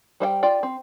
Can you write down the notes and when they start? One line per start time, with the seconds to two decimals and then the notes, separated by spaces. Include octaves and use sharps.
0.20 G3 C5 F5 G5
0.43 F4 D5 G5
0.63 C4